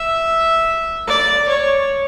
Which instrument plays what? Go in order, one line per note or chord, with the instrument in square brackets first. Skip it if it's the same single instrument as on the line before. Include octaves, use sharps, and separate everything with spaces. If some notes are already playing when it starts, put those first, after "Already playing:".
Already playing: [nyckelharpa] E5
D5
C#5